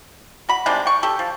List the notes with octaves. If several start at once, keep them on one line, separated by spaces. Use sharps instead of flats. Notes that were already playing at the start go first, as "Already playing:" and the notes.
F#4 B5
C3 D#3 G#3 D4
G5 C#6
G4 A4
F3